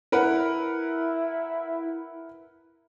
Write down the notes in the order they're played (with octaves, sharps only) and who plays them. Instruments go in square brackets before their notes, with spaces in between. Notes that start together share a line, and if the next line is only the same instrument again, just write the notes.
[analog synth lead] E4 [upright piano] A#4 B4 F#5